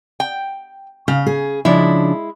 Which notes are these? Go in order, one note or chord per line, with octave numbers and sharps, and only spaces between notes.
G5
C#3 F5
G#4
C#3 F3 G#3 D4 E4